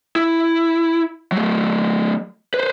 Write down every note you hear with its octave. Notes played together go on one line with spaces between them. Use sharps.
E4
F#3 A3
B4 C5